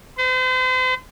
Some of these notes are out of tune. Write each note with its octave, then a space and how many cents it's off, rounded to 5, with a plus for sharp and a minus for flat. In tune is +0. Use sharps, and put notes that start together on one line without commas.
C5 -40